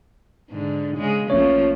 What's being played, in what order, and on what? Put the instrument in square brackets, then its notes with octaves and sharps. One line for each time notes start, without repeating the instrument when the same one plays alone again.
[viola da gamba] G#2 D3
C#3 G#3
[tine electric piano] A#1 C#4 C#5 [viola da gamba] F3 A3 A#3